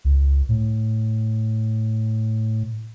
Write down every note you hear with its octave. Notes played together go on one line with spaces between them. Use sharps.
C#2
A2